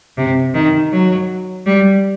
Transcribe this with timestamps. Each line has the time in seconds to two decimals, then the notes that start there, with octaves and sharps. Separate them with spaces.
0.17 C3
0.54 D#3
0.91 F#3
1.66 G3